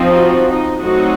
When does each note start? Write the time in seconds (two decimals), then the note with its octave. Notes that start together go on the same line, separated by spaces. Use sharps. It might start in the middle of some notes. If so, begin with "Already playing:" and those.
Already playing: F3 C4 D#4
0.15 F#4
0.48 D#4
0.81 F#3 A3 C4 D#4 F#4